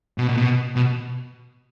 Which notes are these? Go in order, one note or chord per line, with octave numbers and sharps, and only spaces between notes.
B2
A#2
B2
B2